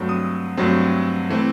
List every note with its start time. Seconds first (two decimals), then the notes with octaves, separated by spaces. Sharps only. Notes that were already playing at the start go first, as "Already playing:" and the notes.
Already playing: G2 F#3 A3 C4
0.09 D#6
0.57 G2 F#3 A3 C4
1.29 E3 A3 C4